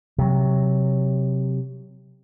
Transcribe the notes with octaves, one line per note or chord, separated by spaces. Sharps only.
C3 F#3